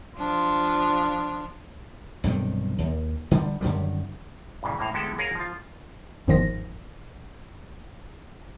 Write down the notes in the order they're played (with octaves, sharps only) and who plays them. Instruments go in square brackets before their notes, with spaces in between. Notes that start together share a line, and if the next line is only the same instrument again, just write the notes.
[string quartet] F3 D4 F4
[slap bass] B1 G2 C3 D#3
D#2
D3 G3
F#2 D3 D#3 G3
[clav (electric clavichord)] G2 A#2 C#3 E3
A2 A#3 A#5
D3 G#3 B3 E4 G4 A4
G#4 A#4 C#5 F5 F#5 A#5
F3 F4
[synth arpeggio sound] G1 E2 G#2 D#3 F3 A#6